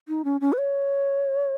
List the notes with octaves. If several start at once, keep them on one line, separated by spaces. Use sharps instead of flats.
D#4
C#4
C#4
B4
C#5